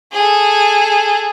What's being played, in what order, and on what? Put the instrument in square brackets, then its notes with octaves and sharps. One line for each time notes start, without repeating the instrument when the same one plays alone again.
[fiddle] G#4 A4